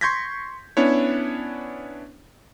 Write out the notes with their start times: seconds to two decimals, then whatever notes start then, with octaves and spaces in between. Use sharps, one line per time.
0.01 C6 C#6 G6 G#6 A#6 B6
0.77 B3 C#4 D4 E4 C#5